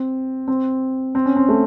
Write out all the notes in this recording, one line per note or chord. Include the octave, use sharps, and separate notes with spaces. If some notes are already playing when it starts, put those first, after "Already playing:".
Already playing: C4
C4
C4
C#4
C4
A3